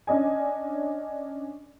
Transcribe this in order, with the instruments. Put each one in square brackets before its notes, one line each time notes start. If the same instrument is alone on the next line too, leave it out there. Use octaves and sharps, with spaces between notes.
[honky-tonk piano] C#4 D4 D#5 G#5